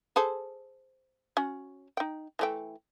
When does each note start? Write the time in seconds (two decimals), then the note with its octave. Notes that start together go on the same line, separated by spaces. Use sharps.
0.16 G#4 A4 C5
1.37 C#4 F#4
1.97 D#4 G5
2.39 E3 A3 G5